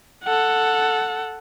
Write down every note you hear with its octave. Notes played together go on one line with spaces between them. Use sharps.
A4 F#5